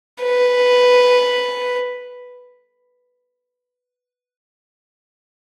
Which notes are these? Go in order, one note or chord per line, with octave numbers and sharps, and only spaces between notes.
B4